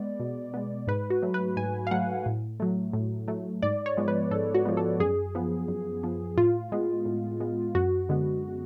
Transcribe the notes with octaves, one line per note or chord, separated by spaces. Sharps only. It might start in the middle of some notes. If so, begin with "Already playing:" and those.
Already playing: G#3 B3 D5
B2
G#3 B3
G#2 B4
F#4
F#3 A3
B4
G#2 G#5
F5
F#3 A3 F#5
A2
F#3 A3
A2
F#3 A3
G#2 D5
C#5
F3 G#3 B3
B4
G#2 A4
F#4
F3 G#3 B3
A4
F#2 G#4
F3 B3
F#2
F3 B3
A2 F4
G#3 B3
A2
G#3 B3
F#2 F#4
D3 G#3 B3